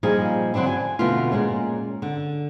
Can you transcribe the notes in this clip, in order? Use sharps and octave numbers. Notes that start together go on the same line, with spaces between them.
A#2 F3 G3 D#4 G#4
D3 F#3 C4 D4 E4
G#5
F2 B2 D3 A3 B3 F4
A#2 G#3 C#4
D3